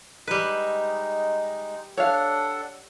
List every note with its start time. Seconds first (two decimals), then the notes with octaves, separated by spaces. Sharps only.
0.27 G3 G#3 D#4 B4
1.97 D4 A4 C#5 F5 F#5